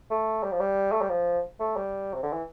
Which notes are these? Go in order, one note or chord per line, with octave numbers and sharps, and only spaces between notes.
A3
G3
F3
G3
A3
G3
F3
A3
G3
C3
D3
E3